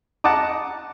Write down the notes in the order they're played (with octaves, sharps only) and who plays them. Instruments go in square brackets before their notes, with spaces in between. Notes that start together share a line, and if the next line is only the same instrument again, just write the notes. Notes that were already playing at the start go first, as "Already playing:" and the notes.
[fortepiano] D#5 F#5 A5 A#5 D6 D#6